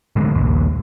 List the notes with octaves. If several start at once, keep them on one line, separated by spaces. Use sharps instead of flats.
D1 A2 D3 G#3
A#1 D#2